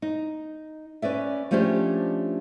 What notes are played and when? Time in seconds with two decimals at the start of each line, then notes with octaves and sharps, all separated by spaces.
0.02 D#4
1.02 C#4 B4 D5 E5
1.51 F3 G3 A3 C#4 D4 G4